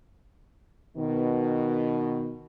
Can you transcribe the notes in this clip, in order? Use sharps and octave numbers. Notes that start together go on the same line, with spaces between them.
B2 D#3